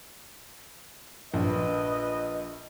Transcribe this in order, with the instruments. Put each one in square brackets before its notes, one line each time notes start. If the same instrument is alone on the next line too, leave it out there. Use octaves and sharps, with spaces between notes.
[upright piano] A#1 [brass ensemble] B4 D#5